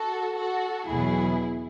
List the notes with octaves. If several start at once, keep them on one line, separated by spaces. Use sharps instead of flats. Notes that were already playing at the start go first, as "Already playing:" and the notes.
Already playing: F#4 A4
F#4 A4
E2 B2 F#3 E4 G#4